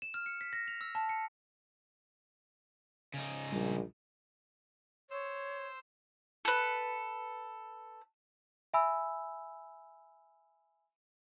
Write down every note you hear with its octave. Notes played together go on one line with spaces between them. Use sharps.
E7
F6
C#7
B6
A#6
F7
E6
A5
C#7
C#3 D#4
A#1 G3
C5 C#5 E6
A4 B4
E5 G#5 B5 E6